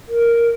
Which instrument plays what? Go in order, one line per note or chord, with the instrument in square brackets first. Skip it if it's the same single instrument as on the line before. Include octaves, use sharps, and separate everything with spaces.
[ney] A#4